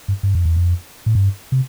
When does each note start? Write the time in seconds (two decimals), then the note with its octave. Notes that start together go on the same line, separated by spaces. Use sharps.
0.08 G2
0.23 G2
0.35 F2
0.45 E2
0.56 F2
1.06 A2
1.15 G2
1.52 C3